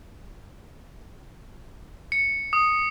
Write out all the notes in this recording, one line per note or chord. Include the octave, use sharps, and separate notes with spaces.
C#7
D#6